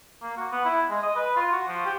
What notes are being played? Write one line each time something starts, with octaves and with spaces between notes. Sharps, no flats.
A#3
F#4
B3
E4
G#3
D#5
B4
F4
F#4
F3
G4